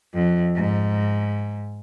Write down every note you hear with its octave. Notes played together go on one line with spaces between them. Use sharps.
F2
G#2